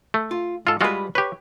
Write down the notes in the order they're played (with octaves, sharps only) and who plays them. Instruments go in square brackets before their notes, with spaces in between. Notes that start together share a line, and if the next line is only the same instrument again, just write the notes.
[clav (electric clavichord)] A3
[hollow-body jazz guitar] F4
[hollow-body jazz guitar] G#2 [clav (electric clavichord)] F4 A4
[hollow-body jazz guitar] G3 B4 [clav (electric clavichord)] G#3 F4 F#4
[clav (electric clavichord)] G4 B4 [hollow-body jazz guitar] C#5